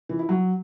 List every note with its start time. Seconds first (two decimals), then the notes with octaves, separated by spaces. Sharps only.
0.09 E3
0.19 E4
0.29 F#3